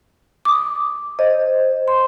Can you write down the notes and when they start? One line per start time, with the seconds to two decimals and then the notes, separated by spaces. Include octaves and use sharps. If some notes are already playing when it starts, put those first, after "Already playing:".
0.45 D6 D#6
1.19 C5 D#5
1.88 C6